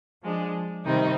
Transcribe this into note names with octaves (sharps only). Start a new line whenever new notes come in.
F3 G#3 D4
C3 D#3 G3 C4 D#4